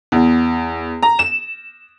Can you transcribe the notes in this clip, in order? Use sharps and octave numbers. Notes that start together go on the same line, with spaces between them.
E2
A#5
E7